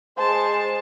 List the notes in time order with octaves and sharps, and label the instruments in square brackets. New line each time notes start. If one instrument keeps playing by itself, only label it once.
[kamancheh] G#3 A5 [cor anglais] C5